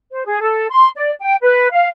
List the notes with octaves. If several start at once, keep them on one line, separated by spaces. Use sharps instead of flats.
C5
G#4
A4
C6
D5
G5
B4
F5